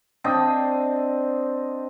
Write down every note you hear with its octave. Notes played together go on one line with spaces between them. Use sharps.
C4 D4 D#5 G5